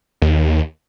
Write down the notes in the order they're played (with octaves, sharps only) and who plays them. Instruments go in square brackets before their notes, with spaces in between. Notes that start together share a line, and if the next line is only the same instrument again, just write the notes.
[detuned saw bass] D#2